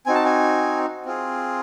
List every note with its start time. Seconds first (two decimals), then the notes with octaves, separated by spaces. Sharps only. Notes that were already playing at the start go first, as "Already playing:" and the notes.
0.06 C4 D#4 F#4 G#5
0.15 A5
0.25 G#5
1.06 C4 F4 G#4